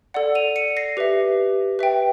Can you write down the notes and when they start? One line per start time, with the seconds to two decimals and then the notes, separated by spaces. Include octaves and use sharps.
0.14 A4 D5 F#5
0.35 D#7 F7
0.56 C#7 D#7
0.77 A#6 C7
0.97 G4 B4 E5
1.79 B4 E5 G5